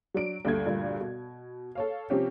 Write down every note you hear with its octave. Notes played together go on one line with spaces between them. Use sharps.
F#3 D4 D7
D2 G2 A3 G#6
D2 G2 A#2
B2
A4 C#5 F5
C3 F3 C4 C#4 G4